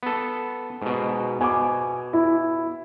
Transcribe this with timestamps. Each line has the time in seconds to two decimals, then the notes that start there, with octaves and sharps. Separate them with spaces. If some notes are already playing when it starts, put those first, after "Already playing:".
0.03 B3 A4
0.82 G#2 B2
1.41 B2 G#5 D6
2.13 E4